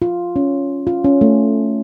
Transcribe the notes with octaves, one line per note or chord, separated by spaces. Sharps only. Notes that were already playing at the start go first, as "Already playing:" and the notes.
F4
C#4
F4
C#4
A3